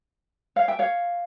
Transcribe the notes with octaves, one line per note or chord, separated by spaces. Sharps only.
C#5 F5
E5 G5
C#5 F5